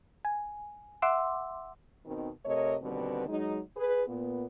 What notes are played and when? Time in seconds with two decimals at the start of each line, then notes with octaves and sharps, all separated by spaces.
0.25 G#5
1.02 E5 F#5 C6 D6 E6
2.06 B2 D#3 C4
2.45 C3 A3 A#4 C#5 D#5
2.82 D#2 B2 D3 G3 C4 B4
3.28 F#3 G#3 D#4
3.77 G#4 B4
4.08 A#2 B3